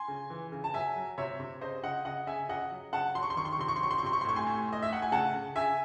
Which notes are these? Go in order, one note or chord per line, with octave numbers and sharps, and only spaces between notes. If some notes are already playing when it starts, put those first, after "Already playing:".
Already playing: G#5 C6
C#3
E3
C#3
A5
F#3 E5 G#5
F#3
C3 C#5 E5
C3
C#3 C5 D#5
C#3 D#5 F#5
C#3 D#5 F#5
C#3 E5 G#5
C#3 D#5 F#5
F#3
C#3 F#5 A5
F#3 C6
C#6
C6
D#3 C#6
C6
C#6
C3 C6
C#6
C6
F#3 C#6
C6
C#6
C3 C6
C#6
C6
A2 C#6
G#5 C6
A2
A2 D#5
E5
A2 F#5
G#5
C#3 F#5 A5
C#3
C#3 E5 G#5